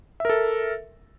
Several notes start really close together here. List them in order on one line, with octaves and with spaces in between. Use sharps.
E5 A#4 A4